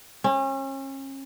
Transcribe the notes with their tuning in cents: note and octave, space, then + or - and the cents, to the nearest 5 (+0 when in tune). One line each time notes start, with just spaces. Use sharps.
C#4 -35